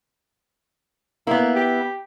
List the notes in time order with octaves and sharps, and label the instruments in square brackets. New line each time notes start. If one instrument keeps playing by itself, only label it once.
[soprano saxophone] A#3 [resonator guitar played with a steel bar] B3 E4
[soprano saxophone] G4